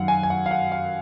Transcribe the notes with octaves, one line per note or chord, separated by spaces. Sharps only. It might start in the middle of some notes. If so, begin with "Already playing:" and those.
Already playing: F#2 D#3 F#3 F5 F#5
G#5
G#5
F#5
F5
F#5
F5